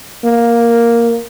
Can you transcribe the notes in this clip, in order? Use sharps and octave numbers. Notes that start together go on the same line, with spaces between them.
A#3